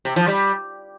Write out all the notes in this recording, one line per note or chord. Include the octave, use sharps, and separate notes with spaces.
C3
F3
G3